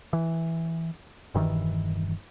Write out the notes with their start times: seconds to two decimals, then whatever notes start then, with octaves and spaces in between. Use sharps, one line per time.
0.13 E3
1.34 E1 G2 D#3 E3